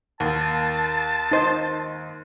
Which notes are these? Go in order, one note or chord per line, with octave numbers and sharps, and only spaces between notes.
D#2 A5
D#4 C5